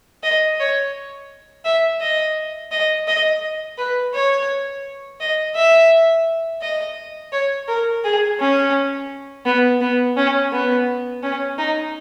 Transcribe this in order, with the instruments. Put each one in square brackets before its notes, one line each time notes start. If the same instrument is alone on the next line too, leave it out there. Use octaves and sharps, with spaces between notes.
[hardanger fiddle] D#5
C#5
E5
D#5
D#5
D#5
B4
C#5
D#5
E5
D#5
C#5
A#4
G#4
C#4
B3
B3
C#4
B3
C#4
D#4